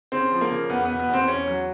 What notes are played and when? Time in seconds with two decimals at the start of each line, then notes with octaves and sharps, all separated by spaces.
0.12 C#3 C4
0.32 F3
0.41 A#3
0.51 C#3
0.70 E2 B3
0.85 B2 B3
0.99 B3
1.08 E2
1.14 C4
1.28 E2 C#4
1.48 F#3